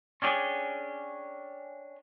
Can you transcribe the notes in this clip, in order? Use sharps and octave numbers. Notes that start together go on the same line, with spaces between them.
C#4 D4 G4 G#4